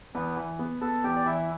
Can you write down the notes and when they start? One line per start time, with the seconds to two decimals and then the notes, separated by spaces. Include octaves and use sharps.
0.14 E2 B3 B4
0.37 E3
0.59 B3
0.81 B3 A4 A5
1.04 E2 G4 G5
1.16 D5
1.26 E3 E4 E5